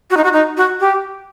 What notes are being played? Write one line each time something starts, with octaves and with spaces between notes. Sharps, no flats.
F#4
D#4
F#4
D#4
F#4
G4